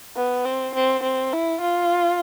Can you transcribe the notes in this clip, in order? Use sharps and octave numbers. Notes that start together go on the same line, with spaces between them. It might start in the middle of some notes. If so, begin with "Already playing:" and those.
B3
C4
C4
C4
E4
F4